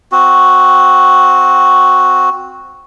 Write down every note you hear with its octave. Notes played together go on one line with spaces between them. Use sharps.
C4 F#4